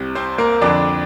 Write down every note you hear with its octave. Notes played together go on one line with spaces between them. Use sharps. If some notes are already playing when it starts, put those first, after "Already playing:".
Already playing: C2 C3
C4 C5
A#3 A#4
F2 D3 D4 D5